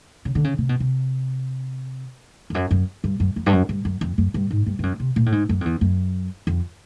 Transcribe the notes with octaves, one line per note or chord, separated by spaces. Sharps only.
C#3
D3
C#3
C3
B2
C3
F2
F#2
F#2
G2
F#2
F2
G2
F#2
G2
F#2
F2
F#2
G2
G#2
G2
G2
F#2
C3
A#2
A2
G#2
F#2
F2
E2
F#2
F2